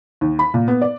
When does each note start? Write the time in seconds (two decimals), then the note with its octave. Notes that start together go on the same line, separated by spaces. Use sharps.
0.21 D#2
0.39 B5
0.54 A#2
0.68 B3
0.81 D5